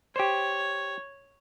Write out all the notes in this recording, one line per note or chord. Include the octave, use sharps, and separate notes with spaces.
G4 C5 C#5